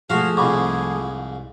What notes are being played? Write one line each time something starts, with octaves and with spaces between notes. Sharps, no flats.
F3 A3 F#4 G#4 F5
C2 F2 G#2 B5 C#6 D6